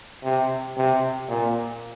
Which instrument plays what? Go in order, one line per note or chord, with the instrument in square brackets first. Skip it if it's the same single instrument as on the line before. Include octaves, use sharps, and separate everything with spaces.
[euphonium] C3
C3
A#2